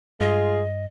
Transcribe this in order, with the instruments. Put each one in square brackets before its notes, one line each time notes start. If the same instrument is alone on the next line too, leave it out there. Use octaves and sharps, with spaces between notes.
[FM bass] G2 [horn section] G#3 F4 G#4 [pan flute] D#5